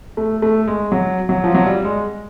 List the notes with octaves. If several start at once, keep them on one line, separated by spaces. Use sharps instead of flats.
A3
A3
G#3
F#3
F#3
F3
F#3
G3
G#3